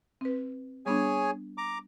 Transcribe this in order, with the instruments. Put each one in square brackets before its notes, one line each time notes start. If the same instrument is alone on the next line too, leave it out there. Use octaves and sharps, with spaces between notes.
[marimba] C4 B4
[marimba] G3 B3 D4 [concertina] G#4 C#5 G#5
[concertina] A#5 D6